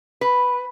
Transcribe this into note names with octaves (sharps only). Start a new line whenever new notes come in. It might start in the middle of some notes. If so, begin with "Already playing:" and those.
B4